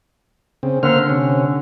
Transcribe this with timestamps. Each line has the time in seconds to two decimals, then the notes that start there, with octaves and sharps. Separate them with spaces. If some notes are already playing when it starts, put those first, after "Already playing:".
0.63 C#3 C4
0.83 D3 A#3 C5 F6
1.09 C3 C#4